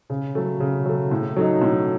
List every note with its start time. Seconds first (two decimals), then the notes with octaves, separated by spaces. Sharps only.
0.10 C#3
0.35 F#3 A3
0.60 C#3
0.86 F#3 A3
1.11 A2
1.36 F#3 A3 D#4
1.62 A2